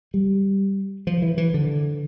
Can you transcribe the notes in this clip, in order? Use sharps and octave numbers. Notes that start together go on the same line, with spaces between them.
G3
F3
E3
E3
D3